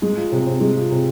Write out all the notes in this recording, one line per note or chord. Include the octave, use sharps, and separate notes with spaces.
G#3
F3
C3
C4
G#3
F3
C3